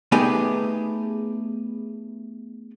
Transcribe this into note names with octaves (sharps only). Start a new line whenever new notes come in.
A3 B3 D#4 G4 G#4 B4